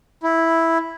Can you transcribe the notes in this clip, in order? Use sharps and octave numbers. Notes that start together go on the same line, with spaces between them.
E4